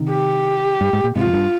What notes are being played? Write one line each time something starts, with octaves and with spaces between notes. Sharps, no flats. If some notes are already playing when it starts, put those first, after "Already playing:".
Already playing: C3 D#3
G4
G2
G#2
A#2
G#2 C3 F4
F2
G2